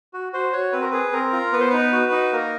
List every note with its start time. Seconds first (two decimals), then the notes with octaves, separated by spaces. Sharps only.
0.14 F#4
0.33 F#4 C5
0.53 F#4 C#5
0.72 C4 B4
0.81 A#4
0.91 G#4 B4
1.12 C4 A#4
1.33 F4
1.53 B3 B4
1.60 C5
1.70 D#4 B4
1.93 F#4
2.12 D#4
2.32 A#3 A#4